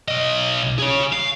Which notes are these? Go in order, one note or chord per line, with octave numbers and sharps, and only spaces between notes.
B1 D#5
G#4 C#5
F5